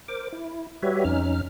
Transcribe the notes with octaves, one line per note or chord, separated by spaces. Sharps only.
A#4 C5 D6
E4
G3 F#4 G4 B4 C#5 E5
F2 C#4 D#4 F6